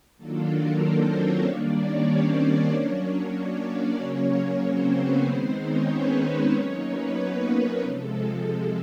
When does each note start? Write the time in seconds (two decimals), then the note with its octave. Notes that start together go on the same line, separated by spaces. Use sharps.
0.17 D#3 F#3 A#3 D4 F4 A4
0.49 A#3 A#4
0.81 C4 C5
1.13 C#4 C#5
1.44 D#3 G3 A#3 D4 D5
1.77 C#4 C#5
2.08 C4 C5
2.40 C4 C5
2.72 F#3 A#3 C#4 D4 C#5
3.36 D4 D5
3.68 D4 D5
3.99 C#3 F#3 A#3 C#4 C#5
4.63 C4 C5
4.95 B3 B4
5.27 D#3 G#3 B3 C4 D#4 C5
5.58 C#4 C#5
5.90 B3 B4
6.22 C4 C5
6.54 F#3 A#3 C#4 D#4 C#5
6.86 B3 B4
7.18 B3 B4
7.49 A#3 A#4
7.82 C3 F3 G#3 A4
8.45 A4